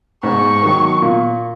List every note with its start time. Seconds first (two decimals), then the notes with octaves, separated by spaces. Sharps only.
0.23 G#2 C#6
0.62 D#3 F#3
1.02 A#2